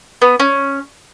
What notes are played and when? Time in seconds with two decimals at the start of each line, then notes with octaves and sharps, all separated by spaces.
0.22 B3
0.40 C#4